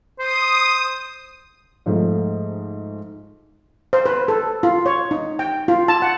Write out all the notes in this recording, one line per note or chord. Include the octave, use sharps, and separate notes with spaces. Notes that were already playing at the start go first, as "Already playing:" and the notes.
C5 D#6
G#2 F3 A3
C5
B4
A4
F4
C#5
D#4
G5
F4
A5
F#5